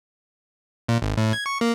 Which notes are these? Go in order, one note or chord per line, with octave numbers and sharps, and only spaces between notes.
A#2
G#1
A2
G#6
C#6
A#3